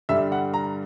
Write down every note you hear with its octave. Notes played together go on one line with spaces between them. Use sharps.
G2 D3 G3 E5
F#5
A#5